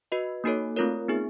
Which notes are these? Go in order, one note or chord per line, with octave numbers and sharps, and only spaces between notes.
F#4 B4 D#5
A#3 D#4 F#4 A4 C#5
A3 C4 F4 A#4 C#5
B3 D#4 G#4